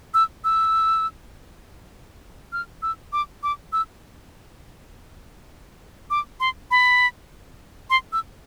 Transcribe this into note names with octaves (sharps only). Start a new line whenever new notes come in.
E6
E6
F6
E6
D6
D6
E6
D6
C6
B5
C6
E6